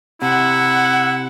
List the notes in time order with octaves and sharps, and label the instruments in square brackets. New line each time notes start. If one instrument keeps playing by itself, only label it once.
[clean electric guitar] C3 [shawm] E4 [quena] F#5